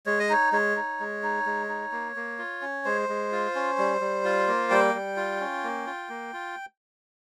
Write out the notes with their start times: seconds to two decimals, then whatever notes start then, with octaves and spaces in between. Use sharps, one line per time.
0.06 G#3 C#5
0.20 D#5
0.29 D#4 C#5
0.52 G#3 C#5
0.76 D#4
1.00 G#3
1.23 D#4
1.46 G#3
1.69 D#4
1.92 A#3
2.16 A#3
2.38 F4
2.62 C#4
2.85 G#3 C5
3.09 G#3
3.32 F4
3.55 C#4
3.78 G3
4.01 G3
4.24 F4
4.47 A#3
4.71 G3 G5
4.94 G3
5.17 F4
5.41 C#4
5.64 A#3
5.87 F4
6.09 A#3
6.33 F4